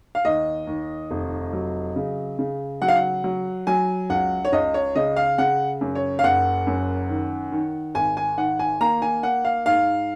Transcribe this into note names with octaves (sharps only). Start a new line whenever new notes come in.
F5
D#2 D#5
D#2
F1
F#3
C#3
C#3
F#3 F#5
F5
F#5
F#3
F#3 G#5
C#2 F#5
C#5
C#2 D#5
C#5
C#3 D#5
F5
C#3 F#5
F#2
C#5
F5
F#1 F#5
F#2
D#3
D#3
G#1 G#5
G#5
D#3 F#5
G#5
A#3 A#5
G#5
A#3 F#5
F5
G#2 F5